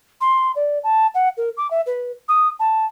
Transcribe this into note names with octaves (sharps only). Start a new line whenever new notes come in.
C6
D5
A5
F#5
A#4
D6
E5
B4
D#6
A5